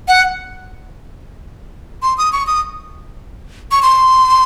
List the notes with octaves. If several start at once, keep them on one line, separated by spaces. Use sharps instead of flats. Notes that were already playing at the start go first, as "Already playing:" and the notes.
F#5
C6
D#6
C#6
D#6
C#6
C6